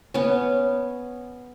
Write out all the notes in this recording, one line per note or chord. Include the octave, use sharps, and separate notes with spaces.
B3 C#4